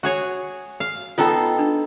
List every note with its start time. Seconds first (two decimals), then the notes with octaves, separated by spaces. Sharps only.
0.03 F#4 G#4 C#5
0.80 F5
1.18 B3 D#4 F4 A4 G5
1.59 D4